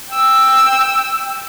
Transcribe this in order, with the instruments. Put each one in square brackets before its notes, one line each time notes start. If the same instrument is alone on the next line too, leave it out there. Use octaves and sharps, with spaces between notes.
[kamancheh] G5 E6